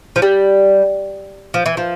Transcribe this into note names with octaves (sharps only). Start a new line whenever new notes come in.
F3
G3
F3
E3
F3